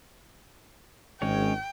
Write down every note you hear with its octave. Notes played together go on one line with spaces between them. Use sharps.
G#1 G#3 C#4 C#5 G5